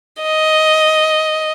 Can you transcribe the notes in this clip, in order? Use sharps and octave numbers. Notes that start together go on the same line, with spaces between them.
D#5